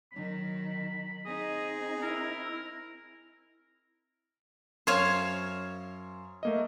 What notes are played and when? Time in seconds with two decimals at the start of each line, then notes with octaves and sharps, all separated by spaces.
0.12 D#3 F#3 B5
1.25 C4 D#4 G#4 D#5
2.02 E4 A#4
4.87 F#2 C5 C#5 F5 C7
6.43 A3 A#3 D#5